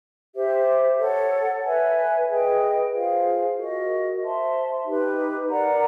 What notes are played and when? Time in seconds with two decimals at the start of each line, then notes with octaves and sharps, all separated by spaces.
0.35 G4 C5 E5
0.99 A4 C#5 F#5
1.64 B4 E5 G#5
2.28 G#4 B4 D#5 G5
2.92 F4 G#4 C5 F5
3.56 F#4 A#4 D#5
4.21 C5 E5 A5 C6
4.85 D#4 G4 B4
5.50 A#4 D5 F#5 A#5